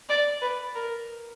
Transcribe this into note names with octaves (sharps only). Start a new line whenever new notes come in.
D5
B4
A#4